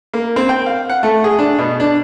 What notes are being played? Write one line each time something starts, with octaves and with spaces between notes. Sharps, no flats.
A#3
C4
G5
F5
F#5
A3
G#4
D4
B2
D4